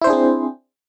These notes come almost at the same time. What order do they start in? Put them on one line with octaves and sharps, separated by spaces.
E4 C5 D4 G#4 C4